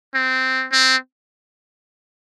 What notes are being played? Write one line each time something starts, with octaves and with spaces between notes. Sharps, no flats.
C4
C4